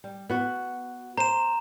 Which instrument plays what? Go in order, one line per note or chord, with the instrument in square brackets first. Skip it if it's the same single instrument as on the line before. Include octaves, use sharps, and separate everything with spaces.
[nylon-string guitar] G3
B3 F#4
[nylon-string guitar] C5 [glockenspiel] A#5 E7